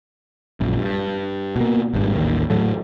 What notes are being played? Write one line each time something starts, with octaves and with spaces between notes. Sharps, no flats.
A#1 F#2
G2
B2 A#3
G#1 G2
A1 D#2 D#3
A2 F#3 A3